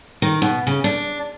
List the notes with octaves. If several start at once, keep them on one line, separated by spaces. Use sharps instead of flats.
D#3
B2
C#3
D4